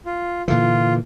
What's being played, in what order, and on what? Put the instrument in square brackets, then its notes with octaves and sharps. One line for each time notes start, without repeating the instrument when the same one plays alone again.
[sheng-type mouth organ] F4
[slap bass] A#2 D3 E3 [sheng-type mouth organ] F4